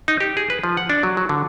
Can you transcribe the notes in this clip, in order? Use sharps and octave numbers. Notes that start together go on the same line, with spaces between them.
D#4
G4
G#4
B4
F3
F#5
D4
F#3
F#3
D3